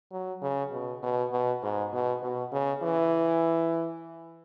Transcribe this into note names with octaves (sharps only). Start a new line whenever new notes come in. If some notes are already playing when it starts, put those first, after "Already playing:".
F#3
C#3
B2
B2
B2
G#2
B2
B2
C#3
E3